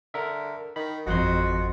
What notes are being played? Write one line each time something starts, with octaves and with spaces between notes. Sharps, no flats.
D3 A#4 E5
D#3 B5
G#1 F2 F#4 D#5 F#5 C6